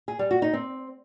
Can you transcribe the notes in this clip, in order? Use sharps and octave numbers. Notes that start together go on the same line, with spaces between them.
G#4
G3
F#4
D#4
C4